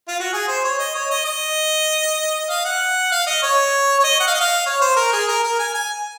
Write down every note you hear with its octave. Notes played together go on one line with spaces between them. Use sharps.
F4
F#4
G#4
C5
C#5
D#5
C#5
D#5
D#5
F5
F#5
F5
D#5
C#5
C#5
D#5
F#5
F5
D#5
F5
C#5
C5
A#4
G#4
A#4
A#4
G#5
G#5